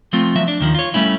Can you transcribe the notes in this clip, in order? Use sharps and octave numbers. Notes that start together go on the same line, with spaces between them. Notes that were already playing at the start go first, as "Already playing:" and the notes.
F3 A3 C4 F4
F3 F#3 E5
D4
D#2 D#3 F3
F4 C#5
G3 A3 C#4 E4